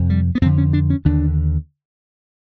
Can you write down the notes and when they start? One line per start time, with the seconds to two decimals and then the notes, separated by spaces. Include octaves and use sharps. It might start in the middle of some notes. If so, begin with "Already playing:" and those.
Already playing: F2 C3
0.10 G3
0.35 B3
0.42 F2 C4
0.46 D3
0.58 C#4
0.73 D4
0.90 C#4
1.05 D#2 D3 D4